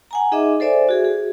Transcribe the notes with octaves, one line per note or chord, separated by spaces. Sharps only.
F#5 G#5 A#5
D#4 G#4 D#5 E5 D6
A4 C5 D5 E5 G#5
F#4 G#4
G#4